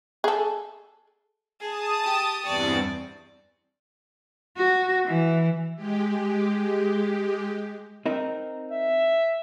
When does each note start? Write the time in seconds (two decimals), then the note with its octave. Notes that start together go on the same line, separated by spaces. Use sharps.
0.24 G#4 A4
1.60 G#4 A5 D#6
2.04 G4
2.45 E2 G2 C4 D5 C#6
4.57 F#4
5.06 E3
5.76 G#3 G4
8.06 C4 D#4 A#4
8.71 E5